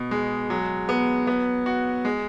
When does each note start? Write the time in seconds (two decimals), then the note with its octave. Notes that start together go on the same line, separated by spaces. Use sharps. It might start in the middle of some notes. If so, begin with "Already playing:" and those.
Already playing: B2
0.11 G#3
0.50 F#3
0.89 B3
1.27 B3
1.66 F#4
2.05 G#3